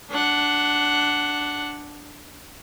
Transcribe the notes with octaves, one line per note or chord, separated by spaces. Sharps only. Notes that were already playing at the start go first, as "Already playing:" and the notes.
D4 F#5